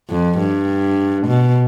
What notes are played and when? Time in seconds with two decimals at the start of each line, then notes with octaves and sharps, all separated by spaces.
0.09 F2
0.39 G2
1.27 B2